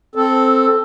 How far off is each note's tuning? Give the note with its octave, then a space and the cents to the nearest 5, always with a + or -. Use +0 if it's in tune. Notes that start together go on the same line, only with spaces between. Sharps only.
C4 +0 A4 +0